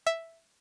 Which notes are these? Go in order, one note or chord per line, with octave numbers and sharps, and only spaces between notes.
E5